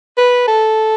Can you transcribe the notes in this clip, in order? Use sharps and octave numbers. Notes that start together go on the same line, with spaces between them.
B4
A4